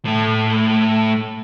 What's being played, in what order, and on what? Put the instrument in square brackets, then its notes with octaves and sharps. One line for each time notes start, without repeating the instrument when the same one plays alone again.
[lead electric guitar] A2 A3